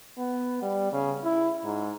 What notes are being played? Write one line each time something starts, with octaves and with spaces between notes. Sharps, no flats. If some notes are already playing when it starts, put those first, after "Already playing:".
B3
G3
C#3
E4
G#2